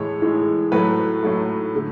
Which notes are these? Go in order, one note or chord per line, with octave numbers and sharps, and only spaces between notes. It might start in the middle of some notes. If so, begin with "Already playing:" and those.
Already playing: A2 E3 G#3 C#5
A2 E3 G#3
A2 F#3 A3 B4
A2 F#3 A3
D3 A3